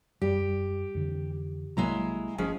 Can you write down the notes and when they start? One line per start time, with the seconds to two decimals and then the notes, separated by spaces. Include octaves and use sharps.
0.22 E1 F#2 G3 G4
0.95 F2 D3 E3
1.77 B1 C3 F#3 G#3 A#3 E4 A#5
2.38 G#1 F3 G#3 C#4 G#4